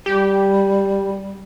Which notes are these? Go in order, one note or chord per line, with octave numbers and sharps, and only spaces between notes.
G3 G4